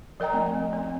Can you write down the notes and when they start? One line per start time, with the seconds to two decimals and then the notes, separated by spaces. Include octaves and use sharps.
0.20 F3 A#4 D#5 G5 A#5
0.33 A3 C4
0.73 C4